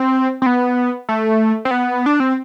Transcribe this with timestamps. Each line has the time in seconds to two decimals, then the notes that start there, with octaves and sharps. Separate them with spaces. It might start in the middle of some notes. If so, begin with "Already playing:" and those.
Already playing: C4
0.42 C4
0.46 B3
1.09 A3
1.65 C4
1.71 B3
2.06 D4
2.20 C4